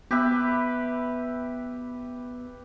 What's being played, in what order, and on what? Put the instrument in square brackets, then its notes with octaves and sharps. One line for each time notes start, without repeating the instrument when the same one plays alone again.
[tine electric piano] B3 [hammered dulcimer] G4 B4 E5